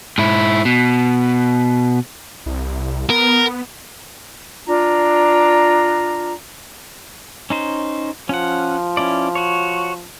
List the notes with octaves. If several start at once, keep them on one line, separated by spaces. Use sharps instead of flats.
G#2 E4
B2
C2
B3 A#4
D4 F4 A#5
C#4 D#4 C5
F3 C#4 F#5
C#4 E4 D5
F#4 C#5